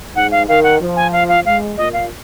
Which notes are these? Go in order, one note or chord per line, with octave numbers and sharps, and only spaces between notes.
G#2 F#5
F5
D#3 F5
F#5
F3
G#5
F5
F5
G#3 F5
A#2 D#5
F5